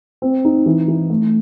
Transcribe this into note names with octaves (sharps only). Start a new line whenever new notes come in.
C4
D#4
E3
E3
A3